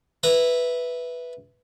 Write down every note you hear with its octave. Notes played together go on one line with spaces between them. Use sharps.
B4 E5 A#5